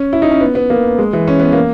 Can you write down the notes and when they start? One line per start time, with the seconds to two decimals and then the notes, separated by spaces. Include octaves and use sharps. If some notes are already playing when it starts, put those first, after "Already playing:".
Already playing: C#4
0.13 E4
0.22 D#4
0.31 C#4
0.41 B3
0.55 B3
0.70 A#3
0.99 G#3
1.13 E3
1.27 C#4
1.40 B3
1.53 A#3